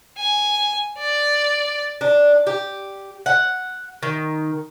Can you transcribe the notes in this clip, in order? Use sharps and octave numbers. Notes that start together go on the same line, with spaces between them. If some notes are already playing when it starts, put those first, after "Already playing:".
G#5
D5
D4
G4
F#5
D#3